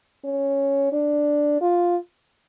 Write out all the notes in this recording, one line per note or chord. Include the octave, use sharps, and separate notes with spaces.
C#4
D4
F4